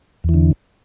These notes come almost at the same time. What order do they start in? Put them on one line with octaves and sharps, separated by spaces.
E2 E3 D3